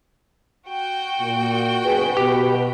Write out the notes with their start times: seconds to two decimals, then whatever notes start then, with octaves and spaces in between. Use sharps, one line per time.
0.69 F#4 G5
1.20 A#2
1.85 F#1 B1 G#4 B4
2.17 B2 G4